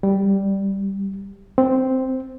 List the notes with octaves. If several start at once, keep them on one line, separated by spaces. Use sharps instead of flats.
G3
C4